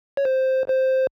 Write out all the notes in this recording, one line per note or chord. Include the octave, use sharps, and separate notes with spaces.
C#5
C5
C5